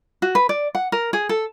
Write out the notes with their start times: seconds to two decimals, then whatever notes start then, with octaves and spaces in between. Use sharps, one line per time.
0.22 F#4
0.35 B4
0.49 D5
0.75 F#5
0.92 A#4
1.13 G#4
1.29 A4